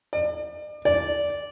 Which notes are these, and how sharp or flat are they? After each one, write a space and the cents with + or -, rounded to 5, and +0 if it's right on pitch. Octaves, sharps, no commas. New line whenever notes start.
D5 +35
D5 -10